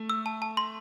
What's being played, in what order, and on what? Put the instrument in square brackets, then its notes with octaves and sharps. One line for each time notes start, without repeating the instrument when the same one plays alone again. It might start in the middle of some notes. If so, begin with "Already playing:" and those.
Already playing: [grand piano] A3
[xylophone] E6
A5
A5
C6